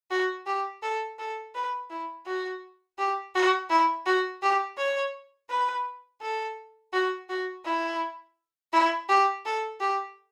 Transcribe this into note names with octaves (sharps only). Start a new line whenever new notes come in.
F#4
G4
A4
A4
B4
E4
F#4
G4
F#4
E4
F#4
G4
C#5
B4
A4
F#4
F#4
E4
E4
G4
A4
G4